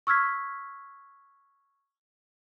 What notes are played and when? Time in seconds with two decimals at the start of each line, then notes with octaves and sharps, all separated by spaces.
0.07 C#6 E6 F6 G#6 B6